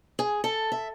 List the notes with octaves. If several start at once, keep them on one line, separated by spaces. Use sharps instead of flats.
G#4
A4
E5